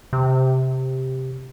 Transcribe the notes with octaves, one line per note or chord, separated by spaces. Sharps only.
C3